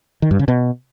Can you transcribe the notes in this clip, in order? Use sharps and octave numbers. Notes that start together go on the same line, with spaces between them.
D#3
G2
C#3
B2